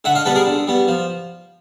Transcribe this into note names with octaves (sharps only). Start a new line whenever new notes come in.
D3 E5 F#5
D#5 F5
G3 B3 A4 B4
G#4 A#4
D3
G3 B3
F3